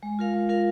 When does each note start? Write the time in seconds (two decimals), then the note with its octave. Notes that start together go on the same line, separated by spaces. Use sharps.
0.03 G#3
0.19 F4 A#4 F5
0.34 G#3
0.49 F4 A#4 F5